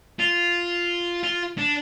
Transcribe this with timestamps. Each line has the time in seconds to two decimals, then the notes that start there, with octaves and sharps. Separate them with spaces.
0.20 F4
1.24 F4
1.58 D4